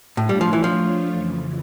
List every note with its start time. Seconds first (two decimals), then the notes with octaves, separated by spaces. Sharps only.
0.17 A2 A3 D4 F4 C#5 F5
0.29 G3
0.41 F3
0.53 E3
0.64 F3
1.10 F2 C#3 E3